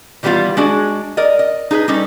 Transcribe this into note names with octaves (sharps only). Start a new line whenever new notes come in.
D#3 E3 G3 B3 F4 F5
G#3 D4 F#4 G#4
A#4 D5 D#5
D#5
D#4 G#4 A#4 B4
G3 C#4 D#4 A4